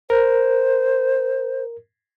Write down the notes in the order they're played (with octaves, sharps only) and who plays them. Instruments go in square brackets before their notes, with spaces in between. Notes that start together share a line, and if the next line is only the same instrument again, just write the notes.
[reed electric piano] A#4 [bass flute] C5